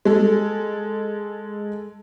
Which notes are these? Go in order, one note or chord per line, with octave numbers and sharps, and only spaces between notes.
G#3 A4